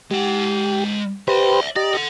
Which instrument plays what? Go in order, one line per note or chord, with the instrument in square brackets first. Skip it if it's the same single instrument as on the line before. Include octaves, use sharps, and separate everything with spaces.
[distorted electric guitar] G#3 F#5 [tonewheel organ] G4
[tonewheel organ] G4 B4 C5 [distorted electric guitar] D5 E5
[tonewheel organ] G4 D#5 A#5 [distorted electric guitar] D5
[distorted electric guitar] A4 F#5